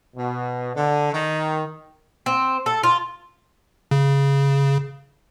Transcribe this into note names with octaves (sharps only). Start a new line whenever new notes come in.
B2
D3
D#3
C4
A4
F4
C#3